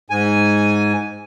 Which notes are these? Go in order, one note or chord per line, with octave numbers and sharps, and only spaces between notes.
G#2 G#5